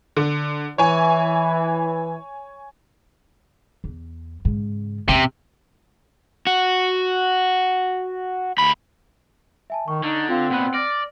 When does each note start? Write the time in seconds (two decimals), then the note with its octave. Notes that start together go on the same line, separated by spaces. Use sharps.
0.17 D3
0.78 E3 C#5 G#5
3.84 E2
4.45 G#2 C#3
5.09 E2 C3 C#4
6.47 F#4
8.58 D2 B5
9.70 E5 G#5 A5
9.88 D#3 C#6
10.03 D3 D#4
10.29 C4 F4 F5
10.50 A#2 B3 F#5 F#6
10.74 D5 F6 A#6